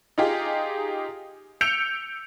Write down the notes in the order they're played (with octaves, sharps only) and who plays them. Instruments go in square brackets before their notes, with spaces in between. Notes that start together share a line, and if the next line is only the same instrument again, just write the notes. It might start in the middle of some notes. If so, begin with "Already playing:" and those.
[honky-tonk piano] D#4 F4 G4 G#4
E6 G6 C#7 D7 F7